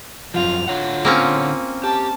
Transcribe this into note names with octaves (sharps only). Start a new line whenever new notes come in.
F#2 F3 F4 F7
D3 F4 C#5 F#5
A#3 C4 C#4
G4 A5